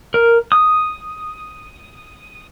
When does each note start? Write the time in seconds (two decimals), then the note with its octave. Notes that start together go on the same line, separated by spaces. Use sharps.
0.14 A#4
0.52 D#6